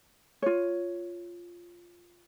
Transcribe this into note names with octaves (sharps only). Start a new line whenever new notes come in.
F4 C#5